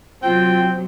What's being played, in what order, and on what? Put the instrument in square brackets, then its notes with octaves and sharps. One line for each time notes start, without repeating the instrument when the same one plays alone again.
[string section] C3 F#3 [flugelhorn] C4 [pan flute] F4 [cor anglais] G5